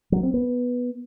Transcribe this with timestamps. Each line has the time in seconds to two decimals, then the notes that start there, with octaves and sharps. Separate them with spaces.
0.12 F#3
0.23 C4
0.34 B3